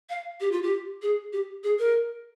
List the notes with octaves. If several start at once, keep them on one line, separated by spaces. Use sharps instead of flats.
F5
G4
F4
G4
G#4
G4
G#4
A#4